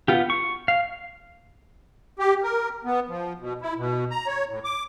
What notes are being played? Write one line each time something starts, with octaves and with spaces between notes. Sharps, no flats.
B3 F4 G4
C#6
F5
G4
A#4
B3
F3
B2
E4
B2
A#5
C#5
A2
D6